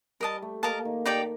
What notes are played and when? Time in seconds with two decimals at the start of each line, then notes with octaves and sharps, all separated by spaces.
0.20 G3 A#4 D#5 A5
0.42 A3
0.63 A#3 A#4 D#5 A5
0.85 D#3
1.06 D#4 G4 D5 G5